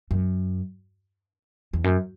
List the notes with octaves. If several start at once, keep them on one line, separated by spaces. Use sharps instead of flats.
F#2
E2
F#2